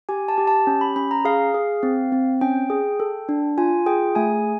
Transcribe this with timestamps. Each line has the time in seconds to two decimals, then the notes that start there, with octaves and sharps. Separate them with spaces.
0.09 G4 G#5
0.28 A5
0.38 G4
0.47 A5
0.67 C#4
0.81 B5
0.96 C#4 B5
1.11 A#5
1.25 G#4 F5
1.54 G#4
1.83 C4
2.12 C4
2.41 C#4 G5
2.70 G#4
3.00 A4
3.29 D4
3.58 F4 G#5
3.86 G#4 G5
4.15 A3 G#5